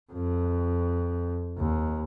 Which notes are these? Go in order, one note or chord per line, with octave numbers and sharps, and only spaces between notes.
F2
D#2